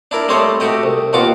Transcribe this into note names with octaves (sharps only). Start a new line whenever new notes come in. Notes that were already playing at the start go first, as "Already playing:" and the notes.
D4 E4 A#4
G3 A3 C4 C5 C#5 D#5
A3 F#4 G4 D#5
C2
D#2 B2 F4 F#4 D6